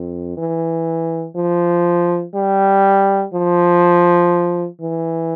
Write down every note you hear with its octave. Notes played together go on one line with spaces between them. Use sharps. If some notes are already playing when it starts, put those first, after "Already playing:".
Already playing: F2
E3
F3
G3
F3
E3